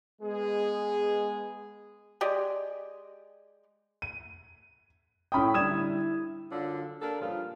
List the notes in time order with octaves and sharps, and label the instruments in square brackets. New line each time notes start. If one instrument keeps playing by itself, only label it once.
[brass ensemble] G#3 B3 G#4
[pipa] G#3 G4 D5 D#5
[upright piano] D#7
[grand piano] A2 C#4 G5 [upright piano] B5 D#6
[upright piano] D3 G3 [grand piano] D#6 G#6 E7
[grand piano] E4
[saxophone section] F#2 D3 F#3 D4 F4
A#3 D4 G4 A4 A#4
G2 A#2 C#3 F3 F4 F5